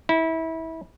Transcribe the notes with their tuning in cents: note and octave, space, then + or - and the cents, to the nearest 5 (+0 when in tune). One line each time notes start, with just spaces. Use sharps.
E4 -25